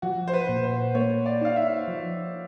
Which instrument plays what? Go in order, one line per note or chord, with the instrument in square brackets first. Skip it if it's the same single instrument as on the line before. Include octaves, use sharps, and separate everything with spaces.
[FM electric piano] F3 [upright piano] F#4
[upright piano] C5
B4
[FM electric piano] A#2
[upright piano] C5
[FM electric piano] A#3 [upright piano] C#5
[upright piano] D5
[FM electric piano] D#4 [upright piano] F5
[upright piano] E5
[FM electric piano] F3